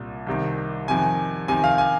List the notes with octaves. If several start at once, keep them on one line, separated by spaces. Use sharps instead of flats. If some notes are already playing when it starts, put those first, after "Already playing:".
Already playing: C2 A#2
C2 C3 D#3
F2 C3 D#3 G#5
F2 C3 D#3 G#5
F5
G#5